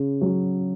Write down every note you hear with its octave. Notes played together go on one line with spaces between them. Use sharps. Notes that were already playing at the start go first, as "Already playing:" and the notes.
Already playing: C#3
F#3 C#4